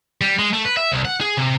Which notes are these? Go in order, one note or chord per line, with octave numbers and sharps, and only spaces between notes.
G3
G#3
A3
B4
E5
C2
F#5
G#4
C3